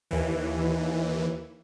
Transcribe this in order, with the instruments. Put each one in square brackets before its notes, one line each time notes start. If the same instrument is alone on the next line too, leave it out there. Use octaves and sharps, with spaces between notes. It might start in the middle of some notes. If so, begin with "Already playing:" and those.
[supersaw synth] D#2 E3